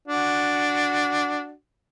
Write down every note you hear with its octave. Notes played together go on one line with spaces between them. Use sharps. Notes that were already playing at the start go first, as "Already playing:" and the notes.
D4 F#4